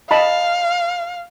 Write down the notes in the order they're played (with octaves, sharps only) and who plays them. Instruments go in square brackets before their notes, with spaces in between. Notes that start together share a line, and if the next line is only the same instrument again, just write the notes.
[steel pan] D#5 A5 B5 [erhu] F5